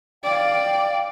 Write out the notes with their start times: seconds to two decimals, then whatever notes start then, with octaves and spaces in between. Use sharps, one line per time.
0.24 D5 F5 G5